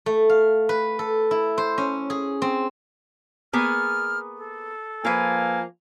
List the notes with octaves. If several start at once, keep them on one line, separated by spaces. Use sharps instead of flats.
A3
F5
B4
A4
E4
C5
C#4
G#4
C4
A#3 B3 G#4 F6
A4
F3 A#3 F4 B4 G#5